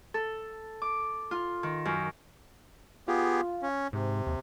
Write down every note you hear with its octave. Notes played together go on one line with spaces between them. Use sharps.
A4
D6
F4
D#3
F#2
B3 F4 G4 G#4
C#4
G#2 C3
D#2